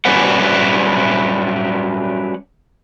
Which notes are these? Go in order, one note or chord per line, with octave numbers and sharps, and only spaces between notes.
F#3 G3 C#4 D4 B4 F#5